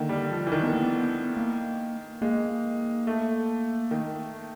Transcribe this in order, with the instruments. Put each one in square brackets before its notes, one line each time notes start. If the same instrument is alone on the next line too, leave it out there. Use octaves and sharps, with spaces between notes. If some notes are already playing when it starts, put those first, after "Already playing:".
Already playing: [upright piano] D3 D#3 [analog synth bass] A#3
[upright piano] G3
F3
E3
D#3
[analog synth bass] B3
A#3
B3
A#3
[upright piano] G#3 [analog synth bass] A#3
[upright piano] A3
D#3